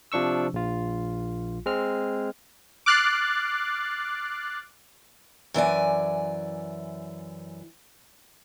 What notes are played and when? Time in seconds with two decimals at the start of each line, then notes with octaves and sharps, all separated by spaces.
0.12 C3 F3 D4 C#6 E6
0.54 A#1 F4
1.66 G#3 C4 F6
2.86 D6 F6 F#6 A6 C7
5.54 F#2 E3 D5 G#5